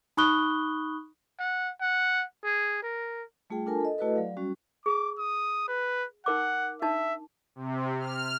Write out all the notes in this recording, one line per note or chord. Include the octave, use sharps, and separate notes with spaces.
D#4 B5 C#6 D#6 F#6 G7
F#5
F#5
G#4
A#4
G3 A3 F4 G#4 G5
D4 F4 A4 A#4 G#5 A5
A4 D#5
A3 E4 F#4 A4 B4 D#5
F#3 D5 F5
G3 C#4 F#4
G#4 D6
D#6
B4
D#4 A#4 F#5 D6
D4 D#4 E5 A5
C3
F6